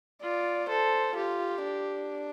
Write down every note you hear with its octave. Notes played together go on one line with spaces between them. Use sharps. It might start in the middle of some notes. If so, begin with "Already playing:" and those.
F4 D5
A4 C5
F4 G4
D4